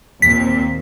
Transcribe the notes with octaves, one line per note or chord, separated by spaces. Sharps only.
D#2 A#2 C4 B6